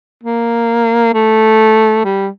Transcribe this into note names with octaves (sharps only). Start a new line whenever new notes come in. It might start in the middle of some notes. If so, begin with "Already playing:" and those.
A#3
A3
G3